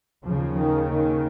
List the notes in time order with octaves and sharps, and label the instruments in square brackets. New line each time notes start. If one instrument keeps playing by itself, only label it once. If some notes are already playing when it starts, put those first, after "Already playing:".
[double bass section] D#2 C#3 F3
D#3
D#3